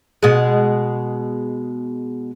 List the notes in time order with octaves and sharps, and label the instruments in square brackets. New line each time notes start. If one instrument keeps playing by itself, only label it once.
[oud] B2 G#3